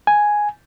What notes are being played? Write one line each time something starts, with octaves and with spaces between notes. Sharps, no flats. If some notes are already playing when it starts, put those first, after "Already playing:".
G#5